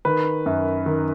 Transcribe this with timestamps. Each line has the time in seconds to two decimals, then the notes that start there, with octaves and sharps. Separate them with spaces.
0.05 D#3 B4
0.46 F#2
0.86 D#3